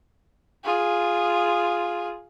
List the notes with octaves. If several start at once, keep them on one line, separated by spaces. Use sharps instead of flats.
F4 G#4